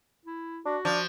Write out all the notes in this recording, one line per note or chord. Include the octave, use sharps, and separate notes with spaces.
E4
D4 F#4
F3 D4